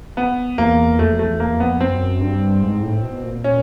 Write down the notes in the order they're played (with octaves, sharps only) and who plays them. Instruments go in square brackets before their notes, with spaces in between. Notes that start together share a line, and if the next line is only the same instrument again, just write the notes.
[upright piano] B3
[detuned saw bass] E2 [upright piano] A#3
[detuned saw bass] F2 [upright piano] A3
[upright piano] A3
[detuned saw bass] E2
[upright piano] A#3
[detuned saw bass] F2
[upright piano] B3
[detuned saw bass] F#2 [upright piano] C4
[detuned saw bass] G2
G#2
A2
B2
A#2
[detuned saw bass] A#2 [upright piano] C#4